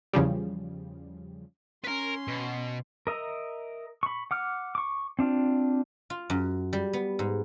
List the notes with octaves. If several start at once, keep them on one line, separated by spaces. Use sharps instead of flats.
E2 C#3 F3 G3
C#4 A#4 B4 C6
B2
A#4 D#5 E5 A#5
B5 C#6
F#5 D6 F6
C#6 D6
C4 D4 F4
F4
F#2
G3
B3
G#2